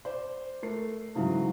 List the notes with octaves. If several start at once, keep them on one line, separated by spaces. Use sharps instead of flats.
C5 D5
A3 A#4 C7
G#2 C#3 E3 F#3